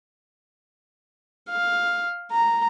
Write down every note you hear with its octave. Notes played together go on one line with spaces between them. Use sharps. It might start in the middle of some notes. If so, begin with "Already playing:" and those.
F5
A#5